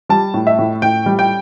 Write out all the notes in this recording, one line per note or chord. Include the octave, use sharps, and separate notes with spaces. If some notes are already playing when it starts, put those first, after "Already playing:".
G3 A5
A2
E5
A2
A2 G5
G3
G5